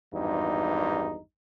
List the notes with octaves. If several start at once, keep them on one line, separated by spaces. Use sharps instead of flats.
G#1 E2 G2 D#4